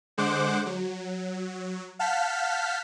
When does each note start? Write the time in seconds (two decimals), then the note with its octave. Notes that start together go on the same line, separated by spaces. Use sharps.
0.18 D3 G#3 C5 F#5 D6
0.66 F#3
1.99 F5 F#5 A5 F6 G6 B6